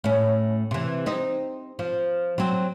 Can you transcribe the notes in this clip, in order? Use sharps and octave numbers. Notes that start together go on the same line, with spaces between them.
A2 C#4
C3 E3
C4 D#4
F3
F#3 C4